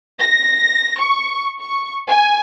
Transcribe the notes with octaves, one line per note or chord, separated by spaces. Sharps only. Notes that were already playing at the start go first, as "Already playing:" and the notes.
A#6
C#6
C#6
G#5